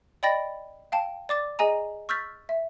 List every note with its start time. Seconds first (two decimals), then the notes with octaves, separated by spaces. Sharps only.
0.23 D5 D#5 G5 B5 A6 A#6
0.92 F5 G5 A5
1.29 D5 D6 A6
1.59 G#4 D#5 G#5 A#5
2.09 C#6 E6 F6 G6 A6 B6
2.49 E5